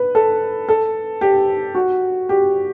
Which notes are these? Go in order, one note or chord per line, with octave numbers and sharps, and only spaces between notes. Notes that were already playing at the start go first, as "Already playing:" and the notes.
Already playing: B4
A4
A4
G4
F#4
G4